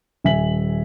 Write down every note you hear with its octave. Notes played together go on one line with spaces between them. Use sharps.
D#1 E5 G#5 B6 F#7